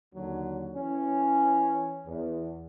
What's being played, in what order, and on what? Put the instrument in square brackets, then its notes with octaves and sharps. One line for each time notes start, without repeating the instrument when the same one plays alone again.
[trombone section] D#2 D3 F#3
E3 C#4
E2